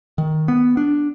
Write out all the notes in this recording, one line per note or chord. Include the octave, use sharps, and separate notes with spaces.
D#3
B3
D4